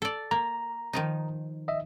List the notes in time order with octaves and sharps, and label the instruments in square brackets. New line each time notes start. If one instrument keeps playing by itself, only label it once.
[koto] A4 D5
[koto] A#3 [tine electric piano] A#5
[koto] D#3 F3 D#4
[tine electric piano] D#5 E5